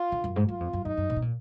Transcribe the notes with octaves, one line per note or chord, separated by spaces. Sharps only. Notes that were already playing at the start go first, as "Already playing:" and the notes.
Already playing: F4
D3
F#2
G#2
F#2 F4
F2
F#2
F#2 D#4
F#2
A#2
B2
A#2